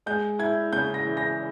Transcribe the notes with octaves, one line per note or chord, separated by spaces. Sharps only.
G#3 G6
E4 G#6
C#3 G6
A#6
E3
A#6